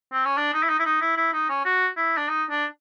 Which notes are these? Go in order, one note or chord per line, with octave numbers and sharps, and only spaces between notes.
C4
C#4
D4
D#4
E4
D#4
E4
D#4
E4
E4
D#4
C#4
F#4
E4
D4
D#4
D4